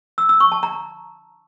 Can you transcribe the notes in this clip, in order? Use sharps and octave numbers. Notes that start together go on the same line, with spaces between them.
E6
E6
C#6
A5
A#5